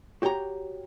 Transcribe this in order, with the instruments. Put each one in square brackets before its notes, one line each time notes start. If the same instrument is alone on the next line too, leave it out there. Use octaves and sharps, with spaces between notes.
[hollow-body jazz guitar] F#4 G4 C#5 G5 A#5